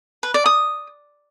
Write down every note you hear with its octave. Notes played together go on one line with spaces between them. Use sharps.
B4
D5
D#6